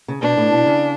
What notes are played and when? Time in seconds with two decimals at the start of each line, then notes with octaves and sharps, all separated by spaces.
0.08 C#3
0.22 B2 D4
0.37 A2
0.52 B2
0.66 C#3